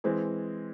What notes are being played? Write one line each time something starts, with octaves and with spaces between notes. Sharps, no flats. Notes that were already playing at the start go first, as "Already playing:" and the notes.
E3 G#3 C4